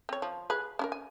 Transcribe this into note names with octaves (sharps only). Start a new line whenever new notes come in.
C4 C#5
F3
G#4 B4
C#4 E4 A#4
G#5